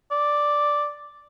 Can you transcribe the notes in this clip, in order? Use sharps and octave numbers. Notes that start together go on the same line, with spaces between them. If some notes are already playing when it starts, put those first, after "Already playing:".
D5